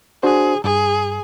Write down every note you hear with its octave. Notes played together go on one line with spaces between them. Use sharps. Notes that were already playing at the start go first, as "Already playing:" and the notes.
D4 F#4 G#4 C5
G2 G#4